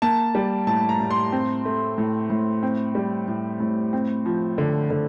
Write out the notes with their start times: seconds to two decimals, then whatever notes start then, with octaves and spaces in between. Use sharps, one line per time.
0.02 A#3 A5
0.35 G3
0.67 A2 A5
0.89 A#5
1.00 A2
1.11 C6
1.32 C4
1.65 A3
1.98 A2
2.30 A2
2.63 C4
2.95 G3
3.28 A2
3.60 A2
3.93 C4
4.26 F3
4.58 D3
4.90 D3